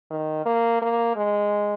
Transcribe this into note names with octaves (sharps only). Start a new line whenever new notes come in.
D#3
A#3
A#3
G#3